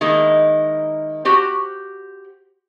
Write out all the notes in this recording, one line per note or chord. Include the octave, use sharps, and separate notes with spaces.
D#3 G#3 A#3 D#4 E4
F#4 G4 C5